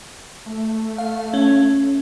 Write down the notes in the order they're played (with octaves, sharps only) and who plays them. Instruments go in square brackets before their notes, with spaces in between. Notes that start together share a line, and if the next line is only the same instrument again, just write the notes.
[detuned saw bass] A3
[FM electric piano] F5
C#4